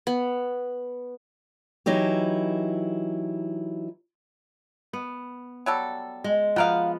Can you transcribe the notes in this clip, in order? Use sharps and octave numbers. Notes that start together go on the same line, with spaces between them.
B3
E3 F#3 D#4 E4 G4
B3
F#3 G3 A4
G#3
F3 B3 F#4 A#4 F5